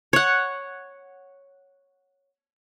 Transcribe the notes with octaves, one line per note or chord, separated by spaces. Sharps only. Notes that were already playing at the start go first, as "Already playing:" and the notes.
C#5 F#5